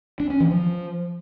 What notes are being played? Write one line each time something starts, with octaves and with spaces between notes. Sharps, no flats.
D4
C#4
E3
F3